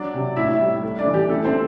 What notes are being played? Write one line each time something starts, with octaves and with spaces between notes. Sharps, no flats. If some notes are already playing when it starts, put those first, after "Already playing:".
Already playing: F#3 D4 D5
C3
A2 E4 E5
G3
A3
D4 D5
E3
G4
A3 E4 A4
C4 C5